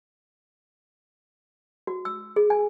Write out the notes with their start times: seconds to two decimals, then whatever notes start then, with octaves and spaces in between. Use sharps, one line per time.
1.87 F#4
2.05 E6
2.36 G#4
2.50 G#5